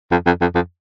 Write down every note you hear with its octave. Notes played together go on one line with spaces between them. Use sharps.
F2
F2
F2
F2